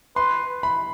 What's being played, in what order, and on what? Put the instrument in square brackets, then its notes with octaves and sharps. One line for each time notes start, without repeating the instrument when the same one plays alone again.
[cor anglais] B4 [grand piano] C6
[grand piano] B5